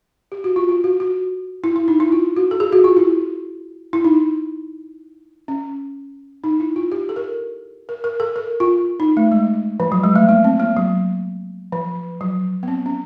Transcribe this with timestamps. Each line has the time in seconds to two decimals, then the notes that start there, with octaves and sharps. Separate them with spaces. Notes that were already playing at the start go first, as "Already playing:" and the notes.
0.32 G4
0.44 F#4
0.56 F4
0.69 F4
0.84 F#4
1.00 F#4
1.64 E4
1.76 E4
1.88 D#4
2.00 E4
2.12 F4
2.36 F#4
2.51 A4
2.60 G#4
2.72 F#4
2.84 F4
2.97 E4
3.93 E4
4.04 D#4
5.48 C#4
6.44 D#4
6.60 E4
6.76 F4
6.92 G4
7.09 A4
7.16 A#4
7.89 A#4
8.04 A#4
8.20 A4
8.36 A#4
8.60 F4
9.00 D#4
9.17 A3
9.32 G#3
9.80 F3
9.92 F#3
10.04 G#3
10.16 A3
10.29 A#3
10.44 C4
10.60 A#3
10.77 F#3
11.72 F3
12.21 F#3
12.63 B3
12.68 C4
12.86 C#4